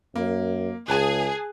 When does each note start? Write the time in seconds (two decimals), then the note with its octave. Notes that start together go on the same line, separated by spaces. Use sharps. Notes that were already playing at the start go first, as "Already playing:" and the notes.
0.16 F#2 A#3
0.88 C#2 G#4 G#5 A5 F#6